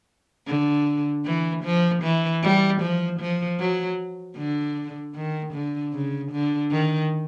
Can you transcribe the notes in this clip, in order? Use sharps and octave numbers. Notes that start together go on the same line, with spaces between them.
D3
E3
F3
E3
G3
F3
F3
F#3
D3
D#3
D3
C#3
D3
D#3